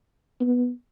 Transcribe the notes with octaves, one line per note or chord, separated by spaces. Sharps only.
B3